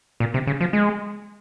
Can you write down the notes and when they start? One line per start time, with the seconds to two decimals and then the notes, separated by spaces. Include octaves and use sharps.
0.20 A#2
0.34 C3
0.47 C#3
0.61 F3
0.73 G#3